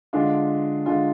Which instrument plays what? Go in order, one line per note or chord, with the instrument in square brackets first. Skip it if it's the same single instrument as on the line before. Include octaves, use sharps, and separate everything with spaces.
[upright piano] D3 G#3 D4 F4
D3 G#3 D4 F4